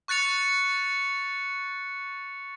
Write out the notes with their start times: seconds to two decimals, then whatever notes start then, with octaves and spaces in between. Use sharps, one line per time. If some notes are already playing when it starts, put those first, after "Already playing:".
0.08 C#6 F#6 A6 C#7 F7